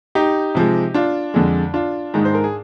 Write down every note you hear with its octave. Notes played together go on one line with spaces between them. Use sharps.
D#4 G4
C3 F3 G#3
D4 F4
F2 D3 G#3
D4 F4
G#2 D#3 G#3
C5
A#4
G#4